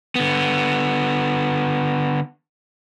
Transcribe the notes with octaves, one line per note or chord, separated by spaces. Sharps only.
D3 B3